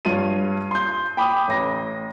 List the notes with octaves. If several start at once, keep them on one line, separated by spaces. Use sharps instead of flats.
G2 F4 C#5 D#7
C6 G6
G5 B5 D6 D#6
A1 A#6